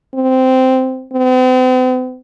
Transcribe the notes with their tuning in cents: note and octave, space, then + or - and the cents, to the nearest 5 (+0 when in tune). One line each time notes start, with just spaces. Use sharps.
C4 -10
C4 -45